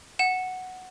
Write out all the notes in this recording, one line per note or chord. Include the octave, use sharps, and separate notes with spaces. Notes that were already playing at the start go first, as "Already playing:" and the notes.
F#5 E7